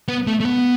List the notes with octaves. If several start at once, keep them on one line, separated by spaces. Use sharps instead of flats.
B3
A3
A3
B3